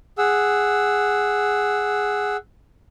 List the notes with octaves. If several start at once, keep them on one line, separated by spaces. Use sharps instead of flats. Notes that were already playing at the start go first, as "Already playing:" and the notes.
G#4 F#5 E6